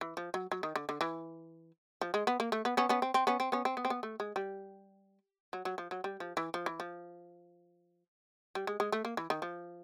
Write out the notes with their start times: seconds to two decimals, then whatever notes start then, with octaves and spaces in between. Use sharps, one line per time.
0.01 E3
0.17 F3
0.34 F#3
0.52 F#3
0.63 D#3
0.76 D3
0.89 D3
1.01 E3
2.01 F3
2.14 G#3
2.27 B3
2.40 A#3
2.52 A3
2.65 B3
2.77 B3 C#4
2.89 B3 C#4
3.02 C4
3.14 C4
3.27 B3 C#4
3.40 C4
3.52 B3 C#4
3.65 C4
3.77 B3
3.85 C4
3.90 B3
4.03 A3
4.20 G#3
4.36 G3
5.53 F#3
5.65 F#3
5.78 F3
5.91 F#3
6.04 G3
6.20 F3
6.37 E3
6.54 F3
6.66 E3
6.80 F3
8.55 G3
8.67 G#3
8.80 G#3
8.92 A3
9.05 A#3
9.17 E3
9.30 D#3
9.42 F3